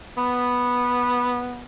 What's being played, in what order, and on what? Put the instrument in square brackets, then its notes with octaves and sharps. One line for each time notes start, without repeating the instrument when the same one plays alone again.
[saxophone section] B3